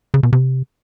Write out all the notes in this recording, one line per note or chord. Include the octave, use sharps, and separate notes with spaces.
C#3
B2
C3